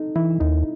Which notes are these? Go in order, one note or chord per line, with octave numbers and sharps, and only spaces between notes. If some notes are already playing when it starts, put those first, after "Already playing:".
Already playing: D#4 A4
E3 E4
D#2 D#4